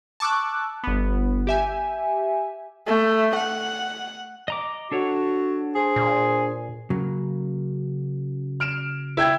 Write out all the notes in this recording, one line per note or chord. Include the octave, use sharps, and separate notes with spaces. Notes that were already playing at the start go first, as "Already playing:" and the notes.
A5 C#6 D6 E6 F#6
G1 B3
G4 E5 G#5
A3
F#5
D#5 A#5 D6
D4 F#4 A4 C#5
G#4 C5
A#2
C#3 F#3 A#3
F6 D7 E7
E4 G5 G#6